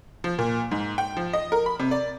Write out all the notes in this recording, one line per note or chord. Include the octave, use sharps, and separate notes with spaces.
F3
A#2
G#2
G5
F3
D#5
A#4
B5
C3
D5